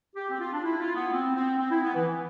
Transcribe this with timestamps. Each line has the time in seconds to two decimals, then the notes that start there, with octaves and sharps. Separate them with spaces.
0.16 G4
0.29 C4
0.40 F4
0.53 D4
0.64 E4
0.80 F4
0.95 B3
1.12 C4
1.35 C4
1.59 C4
1.71 E4
1.82 B3
1.94 E3